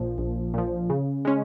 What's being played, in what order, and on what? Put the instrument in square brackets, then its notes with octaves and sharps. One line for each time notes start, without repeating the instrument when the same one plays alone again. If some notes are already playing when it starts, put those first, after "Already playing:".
Already playing: [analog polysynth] A#1 A#2 F3
A#1
A#2 F3
C#3
G#3 C#4